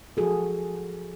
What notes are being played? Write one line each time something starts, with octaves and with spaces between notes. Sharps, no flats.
F3 F#4 G#4 A4